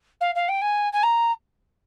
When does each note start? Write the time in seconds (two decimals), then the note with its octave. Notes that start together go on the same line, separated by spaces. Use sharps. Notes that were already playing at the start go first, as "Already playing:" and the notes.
0.21 F5
0.35 F5
0.48 G5
0.61 G#5
0.93 G#5
1.03 A#5